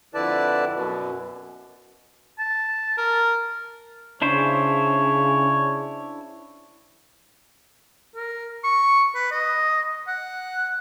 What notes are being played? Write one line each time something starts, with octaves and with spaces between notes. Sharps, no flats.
F2 D3 E4 B4 D5 A5
F#2 B2
A5
A#4
C#3 D4 E4 C5 C#5
A#4
C#6
B4
D#5
F#5